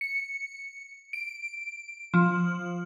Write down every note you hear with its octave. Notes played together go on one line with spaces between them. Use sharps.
C#7
D7
F3